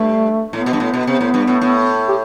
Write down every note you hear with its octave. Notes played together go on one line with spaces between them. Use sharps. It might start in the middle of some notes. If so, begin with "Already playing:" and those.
Already playing: G2 A3
A2 B3
B2
G2
A2
B2
C3
A2
G2
A2
A2
G4